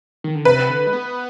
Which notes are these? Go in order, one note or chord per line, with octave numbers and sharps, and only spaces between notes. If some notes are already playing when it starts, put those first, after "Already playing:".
D#3
D3
C3 B4
D3
G#3
B3